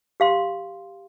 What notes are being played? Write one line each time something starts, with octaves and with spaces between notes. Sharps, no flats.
G4 F5 C6